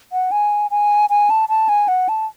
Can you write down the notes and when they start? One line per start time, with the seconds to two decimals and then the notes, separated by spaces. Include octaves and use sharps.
0.13 F#5
0.31 G#5
0.71 G#5
1.10 G#5
1.30 A5
1.49 A5
1.69 G#5
1.88 F#5
2.09 A5